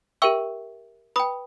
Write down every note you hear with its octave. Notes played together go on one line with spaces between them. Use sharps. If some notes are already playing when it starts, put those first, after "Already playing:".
G4 A#4 E5 G5 C#6 E6
B4 G5 B5 D#6